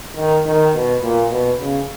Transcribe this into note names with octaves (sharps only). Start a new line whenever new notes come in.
D#3
D#3
B2
A#2
B2
C#3